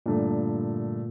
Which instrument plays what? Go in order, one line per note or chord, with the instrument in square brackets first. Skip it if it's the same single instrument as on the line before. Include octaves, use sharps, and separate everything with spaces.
[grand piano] G2 D3 A3 [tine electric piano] A#2